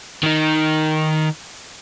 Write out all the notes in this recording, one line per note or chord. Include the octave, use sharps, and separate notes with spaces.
D#3 D#4